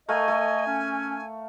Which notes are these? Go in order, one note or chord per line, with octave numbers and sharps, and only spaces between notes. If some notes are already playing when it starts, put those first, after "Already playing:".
A3 A#4 D#5 F5 G#5
A3
C#4